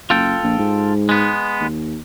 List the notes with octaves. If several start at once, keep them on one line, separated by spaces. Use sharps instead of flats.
F#1 F4 A4 G5
A#1
G#2
G#3 B3
D#2